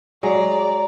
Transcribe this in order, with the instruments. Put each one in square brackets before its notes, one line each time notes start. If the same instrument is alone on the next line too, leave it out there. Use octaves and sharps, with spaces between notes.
[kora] F#3 G#3 [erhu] D5 [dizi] A#5